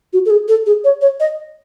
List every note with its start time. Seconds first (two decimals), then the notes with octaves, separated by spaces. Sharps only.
0.13 F#4
0.26 A4
0.30 G#4
0.48 A4
0.66 G#4
0.84 C#5
1.01 C#5
1.20 D#5